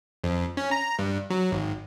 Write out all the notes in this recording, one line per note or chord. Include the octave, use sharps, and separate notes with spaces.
F2
C#4
A#5
G2
F#3
G#1